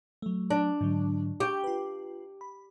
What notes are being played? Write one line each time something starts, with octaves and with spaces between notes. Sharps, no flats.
F#3 A3
D4
G#2 D3 F#3
G4 C#6 G6
F4 B4
B5